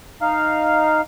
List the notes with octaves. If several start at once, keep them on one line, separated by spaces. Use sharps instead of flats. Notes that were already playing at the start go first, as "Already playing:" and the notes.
D#4 F5